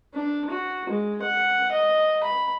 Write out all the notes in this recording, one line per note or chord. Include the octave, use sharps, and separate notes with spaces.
D4
F#4
G#3
F#5
D#5
B5